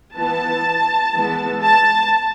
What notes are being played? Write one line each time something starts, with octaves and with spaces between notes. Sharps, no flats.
E3 B3 A5
E3 G#3 B3
A5